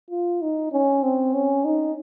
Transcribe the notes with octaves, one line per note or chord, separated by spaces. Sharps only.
F4
D#4
C#4
C4
C#4
D#4